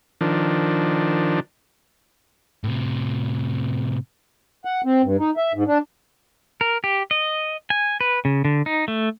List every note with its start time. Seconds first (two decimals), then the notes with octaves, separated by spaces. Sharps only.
0.21 D#3 F3 D4
2.64 A2 C3
4.65 F#5
4.85 C4
5.03 G2
5.19 D#4
5.37 E5
5.54 G#2
5.67 D4
6.61 A#4
6.84 G4
7.11 D#5
7.70 G#5
8.01 B4
8.25 C#3
8.45 D3
8.66 D#4
8.88 A3